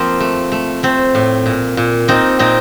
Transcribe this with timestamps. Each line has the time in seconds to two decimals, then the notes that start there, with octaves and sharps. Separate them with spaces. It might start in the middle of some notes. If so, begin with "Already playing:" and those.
Already playing: F3 A#3 C4
0.20 A3
0.52 A3
0.83 A3 C4
1.15 A2
1.46 A#2
1.77 A#2
2.08 A#3 C4 D#4
2.39 A#2 C4 D#4